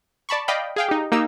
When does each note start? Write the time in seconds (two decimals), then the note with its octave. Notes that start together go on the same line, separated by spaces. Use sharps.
0.29 D5 A5 B5 C#6
0.48 D5 D#5 F5 G5 B5
0.76 G#4 F5 G5
0.89 D#4 G4
1.12 A#3 D#4 G4 E6